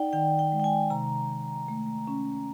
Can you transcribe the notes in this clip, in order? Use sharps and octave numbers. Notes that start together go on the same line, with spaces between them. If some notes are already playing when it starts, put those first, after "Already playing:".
Already playing: D#4 D5 F#5 G5
D#3 G5
G5
G#3
G5
G#5
C3 A#5
D#3
A3
C#4